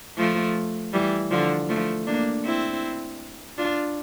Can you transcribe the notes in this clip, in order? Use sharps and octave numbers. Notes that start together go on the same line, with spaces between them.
F3 A3
E3 G3
D3 F3
F3 A3
A#3 D4
C4 E4
D4 F4